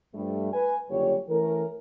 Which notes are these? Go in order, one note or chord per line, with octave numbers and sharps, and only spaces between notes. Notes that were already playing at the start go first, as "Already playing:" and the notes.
G2 F3 G3 A3
B4 G#5
F#1 D3 G3 F4 G4 C#5
E3 A3 C#4 A4 A#4